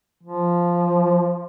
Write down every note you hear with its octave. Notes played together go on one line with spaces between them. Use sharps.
F3